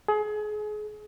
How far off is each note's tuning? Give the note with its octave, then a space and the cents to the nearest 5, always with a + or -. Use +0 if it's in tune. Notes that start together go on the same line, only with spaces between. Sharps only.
G#4 +30